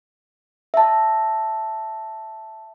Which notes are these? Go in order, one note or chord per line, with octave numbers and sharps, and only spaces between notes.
E5 A5